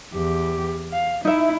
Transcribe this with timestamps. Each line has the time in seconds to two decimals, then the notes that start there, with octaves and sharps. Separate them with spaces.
0.14 E2 G4
0.92 F5
1.25 D#4 E4 E5